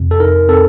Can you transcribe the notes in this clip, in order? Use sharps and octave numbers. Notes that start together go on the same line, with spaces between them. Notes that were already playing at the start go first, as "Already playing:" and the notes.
Already playing: F2 C3
A4
D#4 A#4
C4 A4